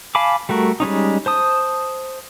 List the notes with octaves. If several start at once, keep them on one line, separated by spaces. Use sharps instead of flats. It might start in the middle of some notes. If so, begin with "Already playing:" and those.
F5 G#5 A5 B5 D6
G3 A3 F#4 A#4
G3 G#3 C#4 D#4
C5 A5 D#6